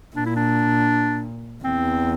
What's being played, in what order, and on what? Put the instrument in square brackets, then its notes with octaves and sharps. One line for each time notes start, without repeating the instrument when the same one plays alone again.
[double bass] A#2 [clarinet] D4
[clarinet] E4
D4
[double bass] E2 [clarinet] C4